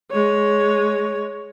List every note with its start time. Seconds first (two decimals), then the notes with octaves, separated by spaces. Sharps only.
0.12 G#3 C#5